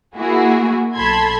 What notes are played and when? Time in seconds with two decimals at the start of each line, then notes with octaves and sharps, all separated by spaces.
0.16 A#3 E4 F#4 G#4
0.95 B1 A4 A5 B5 C6 G#6